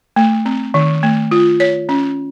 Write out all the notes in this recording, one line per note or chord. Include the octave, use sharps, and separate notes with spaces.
A3
C4
D#3
A3
F4
C#5
C#4